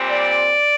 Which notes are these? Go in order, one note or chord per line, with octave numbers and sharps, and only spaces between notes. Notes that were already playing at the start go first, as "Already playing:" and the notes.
Already playing: A#2 G3 C4
D5